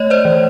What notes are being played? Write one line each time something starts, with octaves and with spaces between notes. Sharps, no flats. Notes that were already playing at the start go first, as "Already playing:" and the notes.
Already playing: A3 C#5 D#5
C5 D5
E3